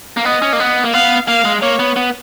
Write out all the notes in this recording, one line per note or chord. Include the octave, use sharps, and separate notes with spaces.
A#3
B3 D#5
C#4
A#3
B3
A#3
B3 F5
A#3 F5
G#3
A#3 C#5
B3
B3